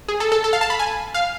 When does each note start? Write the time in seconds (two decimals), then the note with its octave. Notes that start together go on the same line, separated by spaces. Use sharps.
0.09 G#4
0.20 A4
0.32 A4
0.44 A4
0.53 F5
0.61 A5
0.70 B5
0.79 G#5
1.14 F5